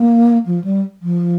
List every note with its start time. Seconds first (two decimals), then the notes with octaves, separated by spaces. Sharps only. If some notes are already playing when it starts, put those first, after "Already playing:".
Already playing: A#3
0.46 F3
0.64 G3
1.02 F3